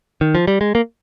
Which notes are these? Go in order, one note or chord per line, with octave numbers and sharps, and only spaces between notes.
D#3
F3
G3
G#3
A#3